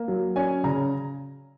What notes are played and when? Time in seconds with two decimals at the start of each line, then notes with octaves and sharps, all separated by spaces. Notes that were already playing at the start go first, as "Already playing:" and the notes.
Already playing: A#3
0.08 F#3
0.36 C#4 G#5
0.64 C#3 A#5